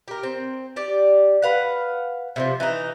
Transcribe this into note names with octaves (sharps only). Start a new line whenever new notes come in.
G4 A#4
C4
G4 D5
B4 F5 F#5
C3 D#3 F3
E3 D#4